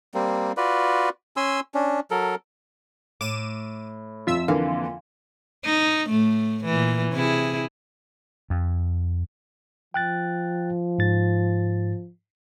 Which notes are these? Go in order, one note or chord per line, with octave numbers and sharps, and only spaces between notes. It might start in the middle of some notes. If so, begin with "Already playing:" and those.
G3 A#3 C4
F4 F#4 B4 D5
C#4 G#5 C6 E6
C#4 D4
F#3 A4 A#4
A2 D6 D#7 E7
F2 F4 E5 E6
D3 E3 A#3 F4
D#4
A2 A3
A#2 E3
C3 E4 G#4
F2
F3 G5 F#6 A6
G#2 A6